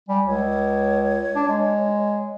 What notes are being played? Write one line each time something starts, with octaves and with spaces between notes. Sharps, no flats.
G3 G#5
C#2 C#5
D4
G#3